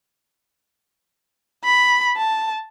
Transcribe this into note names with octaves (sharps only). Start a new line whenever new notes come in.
B5
A5